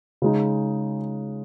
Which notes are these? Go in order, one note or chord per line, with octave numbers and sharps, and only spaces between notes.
C#3 G#3 D#4